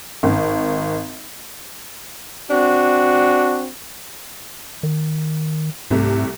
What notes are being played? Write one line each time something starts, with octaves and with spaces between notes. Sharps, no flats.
G#1
C4 D4 F#4
D#3
C2 G#2 C3 A3